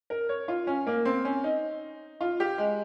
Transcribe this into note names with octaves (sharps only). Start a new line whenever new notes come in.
A#4
C#5
F4
C#4
A#3
C4
C#4
D#4
F4
G4
G#3